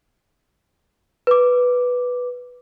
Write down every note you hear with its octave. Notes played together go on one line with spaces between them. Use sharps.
B4 D6